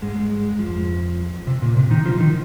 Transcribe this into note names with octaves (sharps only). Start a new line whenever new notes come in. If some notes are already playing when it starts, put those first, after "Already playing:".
G#2 G#3
G#2 G#3
F2 F3
C3
A#2
C3
D#3 D#4
F3 F4
D#3 D#4